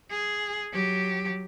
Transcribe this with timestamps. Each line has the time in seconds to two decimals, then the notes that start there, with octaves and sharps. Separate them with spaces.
0.10 G#4
0.73 F#3 G4